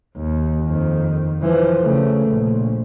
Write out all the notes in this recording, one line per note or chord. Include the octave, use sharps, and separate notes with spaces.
D#2
F2 D#3
E3 F3
C#3 A3
A#1